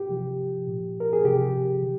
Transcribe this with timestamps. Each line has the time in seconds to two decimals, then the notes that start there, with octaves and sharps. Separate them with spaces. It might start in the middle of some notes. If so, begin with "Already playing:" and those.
Already playing: G4
0.09 C3 F3
0.67 A#2 F3
1.00 A#4
1.13 G#4
1.25 C3 F3 G4
1.83 D#3